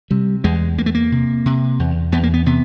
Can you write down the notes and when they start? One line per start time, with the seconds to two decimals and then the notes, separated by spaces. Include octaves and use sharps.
0.11 C3 G3
0.44 E2 G#3
0.78 E2 A#3
0.86 A3
0.95 A#3
1.12 C3
1.46 C3
1.79 E2
2.12 E2 B3
2.23 A#3
2.34 B3
2.46 C3 B3